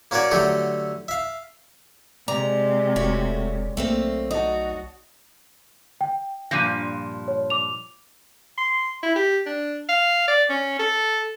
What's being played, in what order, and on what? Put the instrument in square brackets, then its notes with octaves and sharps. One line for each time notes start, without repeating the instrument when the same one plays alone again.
[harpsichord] A#3 C#4 F#4 C#5 D5
D3 F#3 A3 G4 A4
E5 F5
[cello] C3 G#3 [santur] D5 [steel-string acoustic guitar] A#5
[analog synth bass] E1 [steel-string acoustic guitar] A3 F#4 [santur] C#5
[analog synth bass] B1 [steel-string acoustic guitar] A3 A#3 C4
[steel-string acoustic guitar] D#4 [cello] F#4 [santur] D#5 A5
[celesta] G5
[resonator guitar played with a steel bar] G2 A#2 F3 [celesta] A#6 D#7
[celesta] C#5
D6 F7
[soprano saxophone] C6
E4
G4
D4
F5
D5
C#4
A4